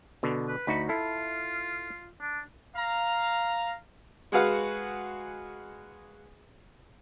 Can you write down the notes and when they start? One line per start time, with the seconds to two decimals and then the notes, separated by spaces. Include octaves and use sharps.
0.23 B2 D3
0.48 B4
0.67 D2 D#4 F#4 B5
0.89 E4 F4 A4
2.21 D4
2.76 F5 A#5
4.32 G#3 F#4 G#4 B4 F5 F#5